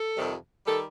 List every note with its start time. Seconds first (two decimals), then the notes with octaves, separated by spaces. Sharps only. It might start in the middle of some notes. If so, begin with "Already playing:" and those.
Already playing: A4
0.16 F2 C3 D#3 G3
0.66 D#3 G3 A4